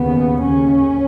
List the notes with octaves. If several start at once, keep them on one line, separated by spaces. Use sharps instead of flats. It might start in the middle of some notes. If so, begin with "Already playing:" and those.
Already playing: D#2 C#3 B3
D#2 C#3 C#4